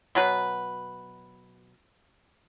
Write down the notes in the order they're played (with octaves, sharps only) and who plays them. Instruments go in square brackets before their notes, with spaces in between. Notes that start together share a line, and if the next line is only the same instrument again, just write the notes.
[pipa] B2 F#3 B4